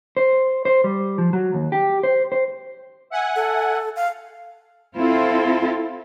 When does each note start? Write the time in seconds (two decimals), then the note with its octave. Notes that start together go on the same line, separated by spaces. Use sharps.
0.17 C5
0.65 C5
0.84 G3
1.18 F3
1.33 F#3
1.54 D#2
1.72 G4
2.03 C5
2.32 C5
3.10 E5 F#5 G#5
3.36 A4
3.96 F5
4.96 C4 E4 F4 A4